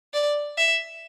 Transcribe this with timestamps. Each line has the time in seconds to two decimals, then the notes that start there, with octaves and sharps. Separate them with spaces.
0.13 D5
0.57 E5